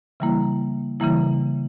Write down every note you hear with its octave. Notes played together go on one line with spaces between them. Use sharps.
C#3 E3 G3 A#3 E4
C#3 E3 G3 A#3 E4